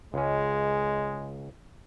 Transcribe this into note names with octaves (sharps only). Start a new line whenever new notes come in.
C#2 G#3 C#4